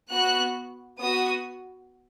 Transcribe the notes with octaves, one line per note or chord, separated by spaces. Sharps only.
B3 F#4 F#6
B3 F#4 D#6